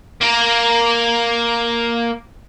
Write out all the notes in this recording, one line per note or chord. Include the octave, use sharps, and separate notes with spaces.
A#3 A#4